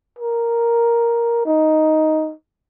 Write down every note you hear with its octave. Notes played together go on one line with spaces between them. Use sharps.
A#4
D#4